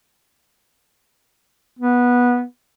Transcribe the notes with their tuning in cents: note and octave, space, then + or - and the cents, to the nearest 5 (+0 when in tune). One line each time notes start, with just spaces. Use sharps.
B3 -15